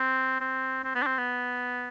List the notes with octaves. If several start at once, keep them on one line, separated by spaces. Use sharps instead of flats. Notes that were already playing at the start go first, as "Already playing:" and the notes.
Already playing: C4
C4
C4
B3
D4
C4
B3